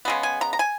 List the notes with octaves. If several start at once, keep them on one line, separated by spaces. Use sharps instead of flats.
C#3 G#3 B3
G#5
A#5
A#5
G#5